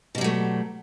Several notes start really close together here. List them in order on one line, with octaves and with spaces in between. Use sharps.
B2 G3 F#3 A3